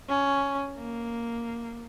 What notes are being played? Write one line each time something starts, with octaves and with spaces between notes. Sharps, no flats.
C#4
A#3